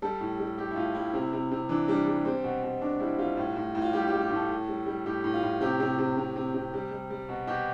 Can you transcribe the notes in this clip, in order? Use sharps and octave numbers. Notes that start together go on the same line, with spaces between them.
G3 A4
A2
G3
G3 G4
E4
A2 F4
G3 E4
C3
C3
C3
E3 D4
G3 D4
G3
G3 C4
B2
B2
B2 D4
G3 E4
G3 F4
A2
A2
A2
F4
G3 G4
G4
G3
G4
A2
A4
A2
G3
G3
A2 G4
A2
F4
A2
C3 G4
C3
C3
C3
C3
C3
G3
G3
G3
B2
B2 G4